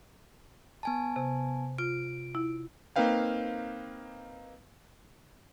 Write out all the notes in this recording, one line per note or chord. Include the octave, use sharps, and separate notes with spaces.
B3 G#5 A5
C3
F4 D7
E4
A#3 C4 D#4 B4 F5 G5